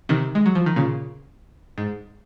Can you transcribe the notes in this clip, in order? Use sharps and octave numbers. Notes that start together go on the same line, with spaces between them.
C3 D#3
G#3
F#3
F3
D#3
A#2 C#3
G#2